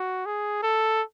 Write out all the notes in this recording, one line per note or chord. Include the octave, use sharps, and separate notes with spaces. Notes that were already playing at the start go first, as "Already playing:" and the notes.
Already playing: F#4
G#4
A4